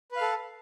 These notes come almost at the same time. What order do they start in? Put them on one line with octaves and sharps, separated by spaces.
B4 F5 A4